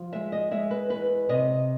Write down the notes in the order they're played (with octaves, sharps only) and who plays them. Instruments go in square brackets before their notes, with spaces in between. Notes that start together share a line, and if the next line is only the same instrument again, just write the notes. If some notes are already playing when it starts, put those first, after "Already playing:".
Already playing: [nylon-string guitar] F3
G#3 E5
D#5
G#3 E5
B4
E2 B4
C3 D#5